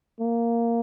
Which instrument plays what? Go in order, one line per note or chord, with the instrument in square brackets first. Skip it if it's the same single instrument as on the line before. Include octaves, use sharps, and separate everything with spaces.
[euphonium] A#3